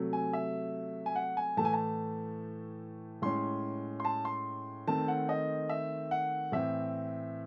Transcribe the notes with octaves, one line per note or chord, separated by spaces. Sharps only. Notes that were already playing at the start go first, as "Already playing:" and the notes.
Already playing: C3 F#3 A3
G#5
E5
G#5
F#5
G#5
A2 E3 A3 A5
G#5
A5
A2 G#3 C#4 C6
C6
A5
C6
D#3 A3 C4 A5
F#5
D#5
E5
F#5
A2 E3 C4 E5